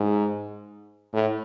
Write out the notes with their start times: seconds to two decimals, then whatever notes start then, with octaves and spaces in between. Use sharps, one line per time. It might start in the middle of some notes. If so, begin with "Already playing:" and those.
Already playing: G#2
1.14 A2